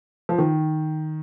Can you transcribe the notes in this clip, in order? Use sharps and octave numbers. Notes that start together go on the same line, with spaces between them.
F3
D#3